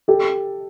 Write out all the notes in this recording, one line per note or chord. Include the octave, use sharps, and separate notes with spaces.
G4 A4